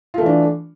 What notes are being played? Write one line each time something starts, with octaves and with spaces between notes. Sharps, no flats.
E3 A3 D4 F4